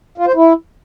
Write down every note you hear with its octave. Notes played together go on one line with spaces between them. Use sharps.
F4
C5
E4